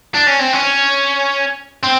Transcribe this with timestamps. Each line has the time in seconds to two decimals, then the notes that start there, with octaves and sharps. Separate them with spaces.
0.15 D4
0.28 C#4
0.40 C4
0.53 C#4
1.84 C4